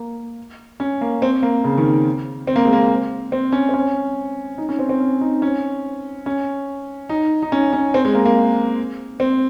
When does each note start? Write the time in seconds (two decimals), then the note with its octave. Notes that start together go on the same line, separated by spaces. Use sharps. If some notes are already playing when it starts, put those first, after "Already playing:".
Already playing: A#3
0.80 C#4
1.01 A#3
1.22 C4
1.43 A#3
1.64 C#3
1.78 D#3
2.47 C4
2.56 A#3
2.65 G#3
2.73 A#3
3.32 C4
3.52 C#4
3.69 C4
3.74 C#4
4.58 D#4
4.69 C#4
4.79 C4
4.89 C4
5.00 C#4
5.21 D#4
5.42 C#4
6.26 C#4
7.09 D#4
7.42 D#4
7.52 C#4
7.73 C#4
7.94 C4
8.05 G#3
8.15 A#3
8.25 A#3
9.20 C4